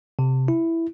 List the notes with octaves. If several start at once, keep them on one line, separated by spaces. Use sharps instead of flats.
C3
E4